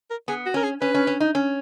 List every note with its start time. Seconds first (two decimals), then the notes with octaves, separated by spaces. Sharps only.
0.10 A#4
0.28 B3 G#4
0.46 F#4
0.54 C#4 A#4
0.63 G#4
0.81 C#4 B4
0.94 C#4
1.07 C#4
1.20 D#4
1.35 C#4